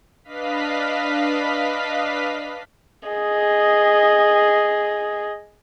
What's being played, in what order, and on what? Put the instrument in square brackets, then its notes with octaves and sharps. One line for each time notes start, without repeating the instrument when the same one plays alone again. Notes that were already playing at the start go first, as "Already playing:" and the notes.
[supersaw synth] D4 B4 D#5 F5 B6
[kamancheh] G#4 D#5